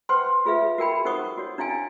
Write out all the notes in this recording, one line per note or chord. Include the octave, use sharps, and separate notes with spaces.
B4 C5 F#5 G5 C6
F4 G#4 B4 E5 F5
F#4 A#4 G5 B5
D#4 A#4 C5 F#5 C#6 D#6
F#4 C#5
D4 E4 F5 G5 G#5